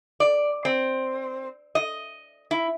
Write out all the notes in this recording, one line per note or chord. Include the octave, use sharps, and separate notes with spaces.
D5
C4
D#5
E4